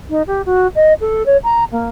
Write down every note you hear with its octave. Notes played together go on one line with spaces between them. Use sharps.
D#4
G4
F#4
D#5
A4
C#5
A#5
A#3